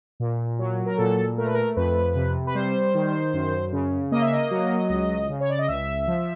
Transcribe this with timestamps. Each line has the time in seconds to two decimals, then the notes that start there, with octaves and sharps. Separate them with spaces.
0.20 A#2
0.59 F#3
0.86 A#4
0.98 A#2 A4
1.37 A3 A#4
1.46 B4
1.54 A#4
1.76 F2 B4
2.15 C3
2.47 B4
2.55 G3 C5
2.94 D#3
3.33 F#2
3.72 C#3
4.12 A#3 D#5
4.22 E5
4.33 D#5
4.51 F#3
4.89 C#2
5.29 C#3
5.40 C#5
5.50 D5
5.59 D#5
5.68 C#2 E5
6.07 F3